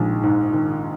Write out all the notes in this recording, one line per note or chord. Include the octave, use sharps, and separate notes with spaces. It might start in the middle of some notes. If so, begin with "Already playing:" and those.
Already playing: A#1 D#3 G#3
G#2
D#3